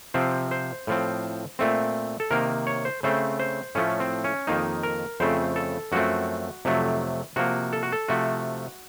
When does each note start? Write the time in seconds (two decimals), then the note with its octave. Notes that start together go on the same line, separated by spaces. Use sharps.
0.14 C3 F3 C4 C5
0.51 C5
0.87 A2 F3 C4
1.59 A#2 A3 C4
2.20 A4
2.31 C3 D#3 A#3 A#4
2.67 C#5
2.85 C5
3.03 C#3 A3 C4 C5
3.40 C5
3.75 A2 F3 A3 C#4
4.00 C4
4.24 C#4
4.47 F2 D#3 A#3 D#4
4.83 A#4
5.20 F2 C#3 A3 C4 C5
5.56 A4
5.92 F#2 F3 A3 C4 F#4
6.65 F2 C3 F#3 A3
7.36 C3 F3 A#3 F#4
7.73 A4
7.83 F#4
7.92 A4
8.08 C3 F3 A3 F#4